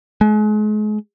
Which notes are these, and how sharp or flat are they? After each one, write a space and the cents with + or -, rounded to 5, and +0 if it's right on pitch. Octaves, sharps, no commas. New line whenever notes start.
G#3 +40